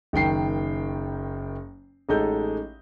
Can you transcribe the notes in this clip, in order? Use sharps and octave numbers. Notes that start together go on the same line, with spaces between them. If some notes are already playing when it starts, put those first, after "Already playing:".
F#1 D#3 G5 C7
A1 G#3 D#4 A4 D#5 G6